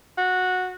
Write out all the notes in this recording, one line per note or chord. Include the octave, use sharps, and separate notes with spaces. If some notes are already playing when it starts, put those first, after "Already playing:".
F#4